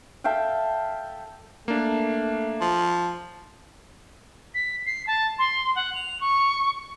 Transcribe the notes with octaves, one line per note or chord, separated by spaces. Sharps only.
A4 E5 F5 G5
A3 A#3 D4
F3
B6
C7
A5
C6
F#5
F7
C#6